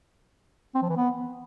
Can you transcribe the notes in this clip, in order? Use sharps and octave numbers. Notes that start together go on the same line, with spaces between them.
C4
F3
E3
B3